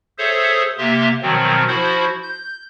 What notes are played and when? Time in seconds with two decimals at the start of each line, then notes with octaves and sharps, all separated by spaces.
0.18 G#4 A4 C5 C#5 E5
0.78 C3 A#3 G4 E5 C6
1.22 B2 D#3 F3 F#3 C4
1.68 F3 E4 F#4 C5
2.23 G6